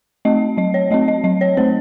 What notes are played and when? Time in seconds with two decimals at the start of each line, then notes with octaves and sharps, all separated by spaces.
0.25 A3 C4 D#5
0.57 F#3 D#5
0.74 C#5
0.91 A3 C4 D#5
1.08 D#5
1.24 F#3 D#5
1.41 C#5
1.57 A3 C4 C5